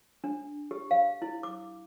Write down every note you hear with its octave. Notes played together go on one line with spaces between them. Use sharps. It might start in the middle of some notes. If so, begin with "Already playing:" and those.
D4
G4
F5
E4
D6